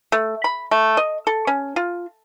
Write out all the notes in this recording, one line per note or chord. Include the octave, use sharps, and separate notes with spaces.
A3
B5
A3
D#5
A4
C#4
F4